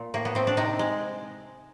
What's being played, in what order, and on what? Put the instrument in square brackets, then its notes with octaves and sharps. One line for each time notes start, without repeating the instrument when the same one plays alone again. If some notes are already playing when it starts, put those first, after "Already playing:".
Already playing: [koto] A#2
A2 A#3
B3
A2 C4
D4
C3 D#4
G#3